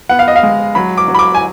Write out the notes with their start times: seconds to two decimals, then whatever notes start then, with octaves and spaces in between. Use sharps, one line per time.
0.09 B3 F#5
0.19 F5
0.28 D#5
0.36 F5
0.43 G#3
0.75 F#3 B5
0.97 D6
1.08 F#3
1.15 B5
1.19 D6
1.34 G#5